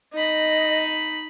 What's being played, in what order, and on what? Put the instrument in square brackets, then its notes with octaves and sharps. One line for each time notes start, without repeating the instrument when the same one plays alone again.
[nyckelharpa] D#4 B5 [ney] D#5